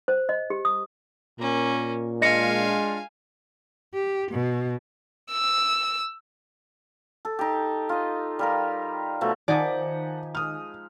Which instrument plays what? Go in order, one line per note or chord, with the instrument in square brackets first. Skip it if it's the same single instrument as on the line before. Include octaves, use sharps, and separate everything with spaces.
[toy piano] C5
D#5
G4
D#6
[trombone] A#2 [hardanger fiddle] A#3 C#4
[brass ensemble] G#3 D4 F4 [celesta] D#5 A#6 C#7 [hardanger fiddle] F5 G#5
[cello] G4
B2
[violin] E6
[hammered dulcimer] A4
D#4 G4
F4 D#5
G3 F4 A#4
B2 F3 A3
[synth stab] D#3 G#5 [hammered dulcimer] F3 D#4 G4 [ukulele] D5 [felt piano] F#5 A5
[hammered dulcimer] G#3 [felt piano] D#6 F6